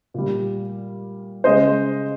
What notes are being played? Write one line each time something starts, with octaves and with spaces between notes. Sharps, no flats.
A#2 G3
C#3 G#3 C5 D#5